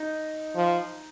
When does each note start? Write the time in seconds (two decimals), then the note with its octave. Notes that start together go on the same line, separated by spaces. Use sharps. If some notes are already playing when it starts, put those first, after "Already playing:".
Already playing: D#4
0.56 F3